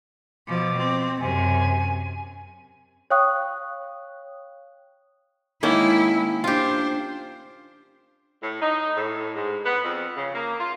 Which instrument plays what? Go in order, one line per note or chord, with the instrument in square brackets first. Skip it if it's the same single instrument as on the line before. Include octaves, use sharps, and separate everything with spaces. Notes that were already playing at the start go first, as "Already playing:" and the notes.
[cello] B2 F3 [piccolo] D6
[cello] C4
[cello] F#2 C3 [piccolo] G#5
[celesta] C#5 F5 G5 C#6 D#6 F#6
[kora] D#3 A#3 C#4 [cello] G#3 E4
[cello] D4 C5 [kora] F4 G4
[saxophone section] A2
D#4
A2
G#2
B3
F2
C#3
A#3
F4